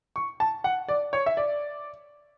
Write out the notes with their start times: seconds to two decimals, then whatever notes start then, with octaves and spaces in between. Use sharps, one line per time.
0.16 C#6
0.40 A5
0.64 F#5
0.88 D5
1.13 C#5
1.26 E5
1.37 D5